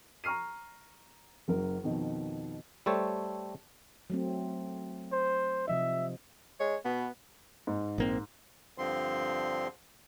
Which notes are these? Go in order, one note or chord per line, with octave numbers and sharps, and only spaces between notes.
A#5 C#6 F6 C7 D#7
F#1 F#2 A#4
F2 B2 D#3
G3 A3 A4 C5 C#5
F#3 A3 C4
C5
C3 F3 D#5 E5
G#3 C#5
B2 B3
G#2
A#1 A#3 C4
G2 D3 F3 C4 C6